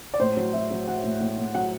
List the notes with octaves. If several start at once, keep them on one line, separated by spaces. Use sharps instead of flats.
D5
A2 C5
F#3
F#3 E5
F#3
F#3 F#5
A2
A2
A2
F#3 F#5